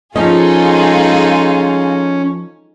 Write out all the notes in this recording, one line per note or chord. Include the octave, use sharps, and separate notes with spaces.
F3 G#3 C#4 D#4 F4 G#4 A4 D#5